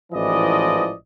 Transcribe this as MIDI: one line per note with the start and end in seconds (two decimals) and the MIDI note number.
0.13 0.95 33
0.13 0.95 44
0.13 0.95 52
0.13 0.95 53
0.13 0.95 74
0.13 0.95 75